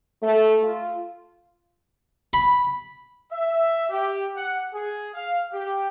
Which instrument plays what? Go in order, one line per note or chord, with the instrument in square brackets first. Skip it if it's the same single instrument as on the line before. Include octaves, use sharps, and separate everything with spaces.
[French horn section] A3
F4
[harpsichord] B5
[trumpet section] E5
G4
F#5
G#4
F5
G4